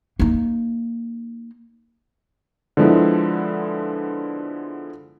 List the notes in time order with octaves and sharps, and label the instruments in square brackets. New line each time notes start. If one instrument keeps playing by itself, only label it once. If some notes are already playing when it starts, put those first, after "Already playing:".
[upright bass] A#3 D#4
[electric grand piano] D3 F3 G#3 B3 E4